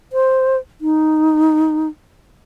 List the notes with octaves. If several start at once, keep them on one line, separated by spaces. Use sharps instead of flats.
C5
D#4